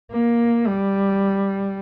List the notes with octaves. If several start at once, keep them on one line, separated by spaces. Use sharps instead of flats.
A#3
G3